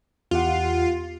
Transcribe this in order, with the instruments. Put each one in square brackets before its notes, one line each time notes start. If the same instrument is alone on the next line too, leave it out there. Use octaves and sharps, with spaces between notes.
[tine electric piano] E2 G4 F#5 [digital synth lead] F4